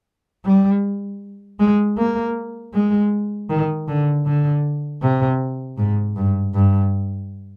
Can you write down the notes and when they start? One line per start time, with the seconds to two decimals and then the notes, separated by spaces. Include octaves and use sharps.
0.46 G3
1.60 G#3
1.98 A#3
2.74 G#3
3.50 D#3
3.88 D3
4.26 D3
5.02 C3
5.78 G#2
6.16 G2
6.54 G2